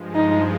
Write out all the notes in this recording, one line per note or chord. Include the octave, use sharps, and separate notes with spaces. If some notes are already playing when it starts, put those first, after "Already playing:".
Already playing: G2 F3 G#3
D#4